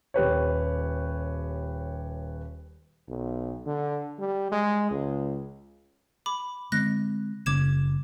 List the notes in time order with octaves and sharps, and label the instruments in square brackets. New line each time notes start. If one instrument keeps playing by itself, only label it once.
[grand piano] D#1 G4 B4 C#5
[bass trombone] B1
D3
G3
G#3
C#2
[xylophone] B5 D6
[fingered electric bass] D3 G#3 C4 [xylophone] F#6 A#6
[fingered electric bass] F#1 C#3 G3 [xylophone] D6 G#6 E7